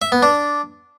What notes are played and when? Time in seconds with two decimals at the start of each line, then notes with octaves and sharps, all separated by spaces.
0.02 E5
0.12 B3
0.23 D4